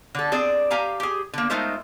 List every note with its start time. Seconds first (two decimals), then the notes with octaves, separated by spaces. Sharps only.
0.15 D3 A4
0.32 C4 G#4 D5
0.71 G4 F5 G#5 A#5
1.00 G4 G#4
1.33 D3 A#3
1.50 G#3 A3 D#4 F4 A#4 C5